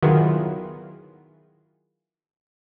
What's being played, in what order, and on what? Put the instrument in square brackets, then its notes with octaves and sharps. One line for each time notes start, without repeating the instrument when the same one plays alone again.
[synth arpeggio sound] D#3 F#3 B3 E4 F4 G#4